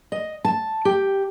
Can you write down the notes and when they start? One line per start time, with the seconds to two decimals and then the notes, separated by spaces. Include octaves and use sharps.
0.12 D#5
0.45 A5
0.85 G4